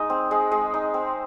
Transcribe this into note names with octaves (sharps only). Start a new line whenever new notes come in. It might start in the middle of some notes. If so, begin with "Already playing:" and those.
Already playing: G#3 D#4 D#5
C4
G#3
G#3
D#4
C4